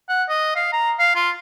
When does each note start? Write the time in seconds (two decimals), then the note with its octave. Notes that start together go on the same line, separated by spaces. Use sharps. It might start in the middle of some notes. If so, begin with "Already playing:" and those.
0.09 F#5
0.30 D#5
0.56 F5
0.73 A#5
1.00 F5
1.16 F4